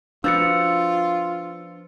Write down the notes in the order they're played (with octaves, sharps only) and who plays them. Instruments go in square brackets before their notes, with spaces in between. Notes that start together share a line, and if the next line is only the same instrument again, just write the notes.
[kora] F3 B3 F#4 [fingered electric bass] D4 [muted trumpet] F4 [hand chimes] E6 A6 C#7